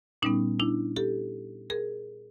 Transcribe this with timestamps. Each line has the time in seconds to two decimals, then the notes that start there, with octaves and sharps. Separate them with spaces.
0.22 A#2 G3 B3 C#4 D#4
0.60 D4 E4
0.96 G4 A4
1.70 G#4 A#4